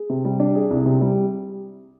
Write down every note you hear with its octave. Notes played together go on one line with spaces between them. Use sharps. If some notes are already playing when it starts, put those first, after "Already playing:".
Already playing: G#4
C3
G3
D4
G#4
C2
C3
G3